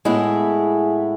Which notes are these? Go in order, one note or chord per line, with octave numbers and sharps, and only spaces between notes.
A2 G#3 B3 E4 G#4